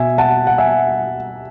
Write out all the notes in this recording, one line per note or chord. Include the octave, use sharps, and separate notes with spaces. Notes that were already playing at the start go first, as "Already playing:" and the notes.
Already playing: B2 E5 G#5
F#5 A5
F#5
E5 G#5